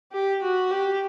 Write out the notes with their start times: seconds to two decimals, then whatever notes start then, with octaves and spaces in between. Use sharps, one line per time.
0.12 G4
0.42 F#4
0.71 G4